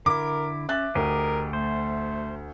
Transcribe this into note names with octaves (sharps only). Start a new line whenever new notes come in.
D3 E4 A#4 D6
C#4 E5 F#6 A6
D2 G4 G#4 A#4 D#5
A3 C5